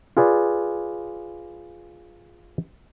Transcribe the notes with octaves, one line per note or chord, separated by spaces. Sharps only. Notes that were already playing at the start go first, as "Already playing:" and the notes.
F4 G#4 B4 D5